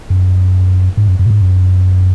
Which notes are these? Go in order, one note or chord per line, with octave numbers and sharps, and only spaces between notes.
F#2
G#2
F#2
F#2
A#2
G#2
F#2